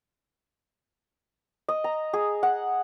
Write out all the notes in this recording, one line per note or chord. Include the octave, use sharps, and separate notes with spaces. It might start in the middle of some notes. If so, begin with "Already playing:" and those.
D#5
A#5
G#4
F#5